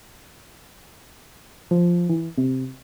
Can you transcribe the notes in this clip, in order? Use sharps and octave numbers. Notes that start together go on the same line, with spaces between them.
F3
E3
C3